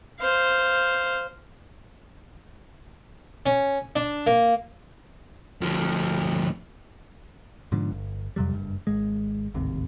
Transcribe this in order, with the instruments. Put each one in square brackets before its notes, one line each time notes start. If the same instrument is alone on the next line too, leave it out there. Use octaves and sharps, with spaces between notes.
[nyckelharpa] C5 F5
[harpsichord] C#4
D4
A#3
[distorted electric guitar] D2 F3
[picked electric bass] G#2 B2 D3 F3
G1
F2 C3 F#3 G3
F#1 G2
G#1 G#3
D1 G#1 D#2 C3